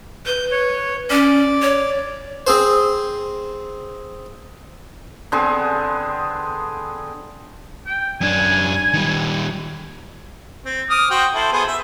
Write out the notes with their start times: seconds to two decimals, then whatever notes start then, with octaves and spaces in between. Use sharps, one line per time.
0.26 B4 G6
0.51 C#5
1.10 C#4 D5
1.62 C#5
2.47 C4 G#4 C5
5.32 D3 B3 C4 G#4
7.86 G5
8.21 F#2 D4 G#5
8.93 D#3 G3
10.66 C4
10.90 D6 D#6 F6
11.10 F#4 C5 G5
11.35 E4 A4 C5
11.53 B3 G#4 C5
11.68 E5